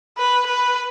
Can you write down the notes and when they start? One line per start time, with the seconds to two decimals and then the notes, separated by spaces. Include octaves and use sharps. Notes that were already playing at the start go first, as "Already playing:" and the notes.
0.18 B4
0.46 B4